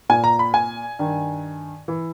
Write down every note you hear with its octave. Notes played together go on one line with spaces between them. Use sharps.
A#2 G#5
A#5
B5
G#5
G2 D#3
E3